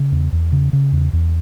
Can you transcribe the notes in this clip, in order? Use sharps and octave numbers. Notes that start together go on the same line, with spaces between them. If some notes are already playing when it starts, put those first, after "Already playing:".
Already playing: C#3
E2
E2
C#3
C#3
E2
E2